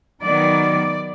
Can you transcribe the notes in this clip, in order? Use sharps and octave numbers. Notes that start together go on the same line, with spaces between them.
D#3 F#3 B3 D5